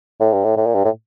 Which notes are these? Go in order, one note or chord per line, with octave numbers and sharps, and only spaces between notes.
A2
G2
A2
A2
A#2
G2
A2